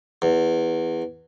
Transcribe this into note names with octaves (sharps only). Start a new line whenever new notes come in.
E2